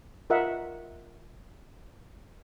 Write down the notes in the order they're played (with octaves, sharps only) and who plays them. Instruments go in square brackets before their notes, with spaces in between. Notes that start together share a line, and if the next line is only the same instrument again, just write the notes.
[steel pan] F4 A#4 D#5 E5 F#5